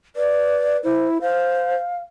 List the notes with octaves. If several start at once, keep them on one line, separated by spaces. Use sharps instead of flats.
B4 D5
E4 C5
C5 F5